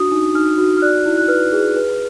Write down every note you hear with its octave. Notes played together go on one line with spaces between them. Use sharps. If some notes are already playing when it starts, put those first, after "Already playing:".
Already playing: D4 F#4 D#6
D#4
D#4 F6
F#4
F6
D5 F#6
E4
F#6
B4 F6
G#4
B4